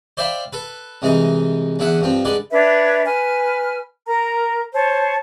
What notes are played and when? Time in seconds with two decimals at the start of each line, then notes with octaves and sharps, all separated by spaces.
0.17 C5 D5 E5 F5 G5 B5
0.53 A4 B4
1.02 C2 E3 G#3 D#4 A#5
1.79 E2 D3 E4 E5 F#5
2.01 G2 F3 C4
2.25 D3 G#3 B4 D5
2.52 D4 B4 C#5 E5
3.06 B4 G#5 F6
4.06 A#4 A#5
4.74 C5 C#5 A5